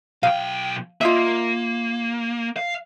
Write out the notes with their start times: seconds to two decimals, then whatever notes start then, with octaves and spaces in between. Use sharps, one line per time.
0.23 B1 F5 G5
1.01 A#3 F4 D#5 E5
2.56 F5